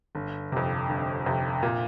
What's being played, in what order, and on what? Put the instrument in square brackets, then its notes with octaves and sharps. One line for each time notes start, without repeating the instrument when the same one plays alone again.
[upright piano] G1
F2 C3
G1
F2 C3
A#2